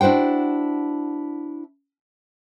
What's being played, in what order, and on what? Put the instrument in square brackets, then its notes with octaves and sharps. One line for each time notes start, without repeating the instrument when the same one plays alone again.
[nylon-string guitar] D4 E4 F#4 C5 G5